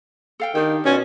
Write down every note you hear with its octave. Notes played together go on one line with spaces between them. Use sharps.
A4 F5 G5
D#3 D4 G4
B2 C#4 F4 C#5 D5